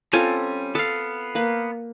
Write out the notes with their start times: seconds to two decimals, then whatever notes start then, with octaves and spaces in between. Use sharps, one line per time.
0.13 G3 C4 C#4 F4 A4 G#5
0.75 B3 A4 F5
1.35 A#3 B4